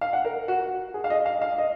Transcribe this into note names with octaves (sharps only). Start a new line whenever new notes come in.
F5
F#5
A#4
F#4
G#4
F5
D#5
F5
F5
D#5